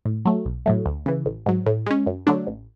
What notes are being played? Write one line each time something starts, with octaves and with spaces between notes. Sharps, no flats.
A2
F#3 A3
B1
A2 F#3 A3
D2
C#3 E3
A1
G#2 F#3
A2
G#3 C#4
F#2
D3 F#3 A3 D4
A1